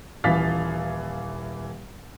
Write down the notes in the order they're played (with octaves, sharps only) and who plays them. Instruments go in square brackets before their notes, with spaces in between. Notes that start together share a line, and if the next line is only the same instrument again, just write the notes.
[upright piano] D#1 E3 F5 A6 B6